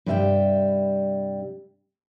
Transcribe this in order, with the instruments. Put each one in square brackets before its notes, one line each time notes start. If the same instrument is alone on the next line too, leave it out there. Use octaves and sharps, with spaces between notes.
[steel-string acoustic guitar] G2 C3 G3 E5 G5